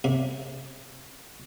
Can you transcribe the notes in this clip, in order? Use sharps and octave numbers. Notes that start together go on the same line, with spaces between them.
C3